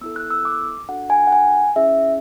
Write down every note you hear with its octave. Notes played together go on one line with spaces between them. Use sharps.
B3 E4 A4 E6
F#6
E6
D6
D4 F#4 A4 F#5
G#5
F#5
G#5
C#4 E4 G#4 E5